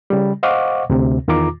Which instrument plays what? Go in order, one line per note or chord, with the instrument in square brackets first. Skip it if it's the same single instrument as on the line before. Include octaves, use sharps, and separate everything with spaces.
[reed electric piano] C#3 G3
C5 D#5 F5 F#5 C#6 D6
D2 C3
E2 D#3 F4 A#5 D6